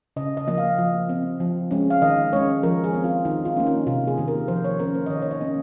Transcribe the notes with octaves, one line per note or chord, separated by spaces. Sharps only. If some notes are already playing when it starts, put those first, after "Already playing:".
C#3 D#5
D#5
F3 A#3 D#5
F5
F3
C4
F3
G#3 C#4
F5
D#3 D#5
G#3 C#4 C#5
F3 A#4
G#4
C4
F4
D#3 D#4
F4
A#3 C#4
D#4
C3 F4
G#4
D#3 A#3
A#4
F3 C5
C#5
A#3 C#4 A#4
C5
D#5
D#3 C#5
C#5
D#5
A#3 C#4